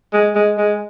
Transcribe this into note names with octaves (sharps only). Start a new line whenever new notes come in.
G#3
G#3
G#3